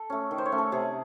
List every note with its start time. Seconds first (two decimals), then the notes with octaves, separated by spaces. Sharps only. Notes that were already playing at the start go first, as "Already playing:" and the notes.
Already playing: A4
0.10 A3 C#4
0.31 D#3
0.38 C5
0.46 C#5
0.52 A3 C#4
0.58 A4
0.72 C3 G#4